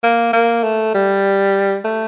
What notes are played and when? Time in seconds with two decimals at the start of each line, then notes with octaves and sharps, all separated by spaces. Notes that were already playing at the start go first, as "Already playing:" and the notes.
0.03 A#3
0.33 A#3
0.63 A3
0.94 G3
1.85 A3